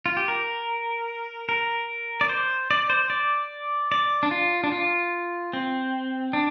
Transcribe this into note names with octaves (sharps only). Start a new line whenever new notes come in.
F4
G4
A#4
A#4
D5
C5
D5
C5
D5
D5
D4
F4
D4
F4
C4
D4